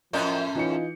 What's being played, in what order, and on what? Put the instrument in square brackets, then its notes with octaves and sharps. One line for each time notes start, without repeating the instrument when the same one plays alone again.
[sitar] F#2 A2 C#4 [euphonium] F3 [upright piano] A#4 D#5 G6
[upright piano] E3 D#4 C#7 [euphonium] F4